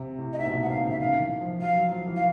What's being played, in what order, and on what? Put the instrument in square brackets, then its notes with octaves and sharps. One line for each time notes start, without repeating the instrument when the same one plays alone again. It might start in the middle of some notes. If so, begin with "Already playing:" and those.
Already playing: [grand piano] C3
A2
[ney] D#5
[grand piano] G#2 [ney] E5
[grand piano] B2
A#2
[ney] F#5
[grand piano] C3 [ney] F5
[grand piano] C#3
[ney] E5
[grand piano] D#3 [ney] F5
[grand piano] E3
F3
[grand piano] F#3 [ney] F5
[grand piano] F#3
F3
E3
[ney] F5